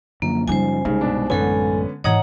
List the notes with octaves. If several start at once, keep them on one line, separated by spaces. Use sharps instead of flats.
F#2 D3 F3 A#3
F#2 C#3 F3 G3 D#4 C5 G#5
C2 C#3 G3 G#3 D#4
G2 B2 D4
A1 F#2 D3 G#3 B3 C#4 A4 G#5
G#2 E3 C#5 D#5 F#5 A#5 D#6 G#6